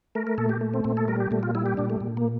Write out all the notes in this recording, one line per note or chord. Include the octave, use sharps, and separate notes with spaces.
A3 A#4
A#4
A#2 A4
G4
A3
C4
A#2 C4
A4
G3 A#4
G4
A#2 A3
F4
G3 E4
G4
A#2 D4
A3
A#2
A#3